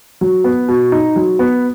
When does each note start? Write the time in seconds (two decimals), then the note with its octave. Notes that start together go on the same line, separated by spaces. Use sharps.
0.21 F#3
0.44 B3
0.68 B2
0.92 D#4
1.16 F#3
1.39 B3